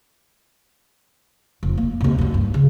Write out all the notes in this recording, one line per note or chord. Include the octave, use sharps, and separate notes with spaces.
F1
A#3
D#2 C3
F#2 F#3
G2
C#3